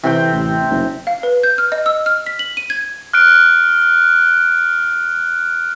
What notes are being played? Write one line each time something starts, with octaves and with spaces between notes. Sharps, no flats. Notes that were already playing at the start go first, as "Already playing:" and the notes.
C3 E3 C4 G5
A1
F#1
F5
B4
G6
F6
D#5
E6
F6
B6
F#7
D#7
G#6
F6 F#6 D7